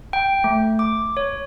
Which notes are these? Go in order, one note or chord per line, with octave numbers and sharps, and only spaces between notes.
G5
A3
D6
C#5